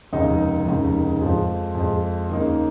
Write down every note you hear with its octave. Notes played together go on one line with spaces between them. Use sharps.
F1 D#2 C#3 G#3 D#4
F1 D#2 C#3 G#3 D#4
F2 F3 G#3
F2 F3 G#3
D#2 C#3 A#3 D#4